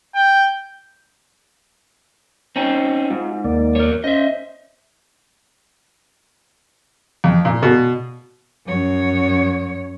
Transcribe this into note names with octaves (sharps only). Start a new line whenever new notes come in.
G5
C4 C#4 D#4
G#2 F4
D#2 A#3 D5
A#4 C#5
C#4 C5 D#5 E5
F2
A#2
B2
F#2 C#5